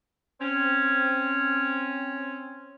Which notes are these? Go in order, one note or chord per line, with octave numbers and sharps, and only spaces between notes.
C4 C#4